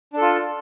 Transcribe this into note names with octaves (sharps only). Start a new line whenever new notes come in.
D4 F4 A4